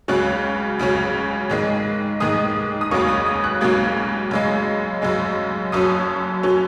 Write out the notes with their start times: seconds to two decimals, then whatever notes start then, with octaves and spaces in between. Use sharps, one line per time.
0.08 C#2 C#3 F#3 C#4 F#6
0.79 C#2 C#3 F#3 C#4
1.50 G#2 D#3 G#3
2.20 G#2 D#3 G#3 D#6
2.81 D#6
2.91 C#2 C#3 F#3 A#3 C#4 C#6
3.08 D#6
3.26 D#6
3.44 F#6
3.61 C#2 C#3 F#3 A#3 C#4 G#6
4.31 F#2 C#3 G#3
5.02 F#2 C#3 G#3
5.72 F#1 F#2 F#3 C#4 D#6
6.43 F#3 C#4